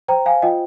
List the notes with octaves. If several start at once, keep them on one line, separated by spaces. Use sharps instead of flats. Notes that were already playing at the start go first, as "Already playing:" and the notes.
C5 G5 A#5
F5 G#5
F4 D#5 G5